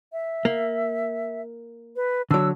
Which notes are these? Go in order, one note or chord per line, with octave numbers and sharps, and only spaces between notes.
E5
A#3
B4
D3 F#3 E6